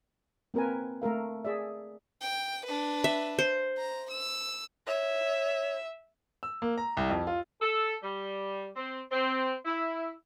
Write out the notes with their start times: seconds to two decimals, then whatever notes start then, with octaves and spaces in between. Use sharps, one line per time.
0.54 A#3 C4 A#4 B4 G#5
1.02 A3 A4 A#4 F5
1.45 G#4 D5 E5
2.21 G5
2.66 D4 B4
3.04 E5
3.39 C5
3.77 A#5
4.11 E6
4.87 C#5 E5
6.43 E6
6.62 A#3
6.78 A#5
6.97 C2
7.10 F2
7.27 F4
7.61 A4
8.03 G3
8.76 C4
9.11 C4
9.65 E4